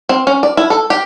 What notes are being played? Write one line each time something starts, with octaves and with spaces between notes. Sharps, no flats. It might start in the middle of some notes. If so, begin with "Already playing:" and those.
C4
C#4
D5
E4
A4
G4